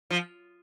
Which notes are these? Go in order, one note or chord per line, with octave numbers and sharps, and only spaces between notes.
F3